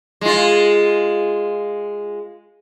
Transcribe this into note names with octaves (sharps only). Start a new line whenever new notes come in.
G#3 F4